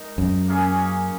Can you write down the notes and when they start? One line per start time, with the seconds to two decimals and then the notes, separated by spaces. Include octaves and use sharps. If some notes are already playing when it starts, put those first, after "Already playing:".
Already playing: G#3 D#4 A#4
0.18 F#2
0.48 A#3 C#4 G#4 C#5